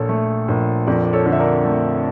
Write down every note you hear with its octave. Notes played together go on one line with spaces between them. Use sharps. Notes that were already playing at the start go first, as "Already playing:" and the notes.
Already playing: A#1 A#2 A4 C#5
A3
A#1
F2 A#4 D5
D5
A4 C#5
D3
E5
A#4 D5
A3